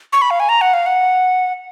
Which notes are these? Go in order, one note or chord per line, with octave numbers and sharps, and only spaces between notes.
C#6
B5
F5
G#5
A#5
F#5
F5
F#5